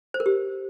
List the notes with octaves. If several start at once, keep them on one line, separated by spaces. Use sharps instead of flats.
C5
A#4
G4